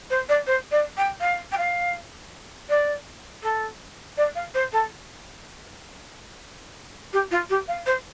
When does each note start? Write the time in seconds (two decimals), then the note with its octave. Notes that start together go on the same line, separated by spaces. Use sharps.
0.10 C5
0.29 D5
0.46 C5
0.71 D5
0.97 G5
1.20 F5
1.51 G5
1.58 F5
2.69 D5
3.42 A4
4.17 D5
4.35 F5
4.54 C5
4.72 A4
7.13 G4
7.31 F4
7.49 G4
7.68 F5
7.86 C5